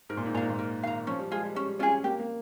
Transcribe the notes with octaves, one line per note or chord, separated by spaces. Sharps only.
G#2 A#4
A#2
G#2
A#2 F5 A#5
G#2
A#2
A#4
D#3 F5 A#5
F3 C#4
G3
G#3 F4 G#4
G3
G3 C#4
C#4 F4 G#4
A#3 G4
A#3